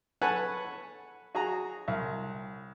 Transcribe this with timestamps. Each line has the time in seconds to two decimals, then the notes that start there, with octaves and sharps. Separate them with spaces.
0.22 A4 B4 C#5 F#5 G#5 A5
1.35 F#4 G#4 A#5
1.88 C2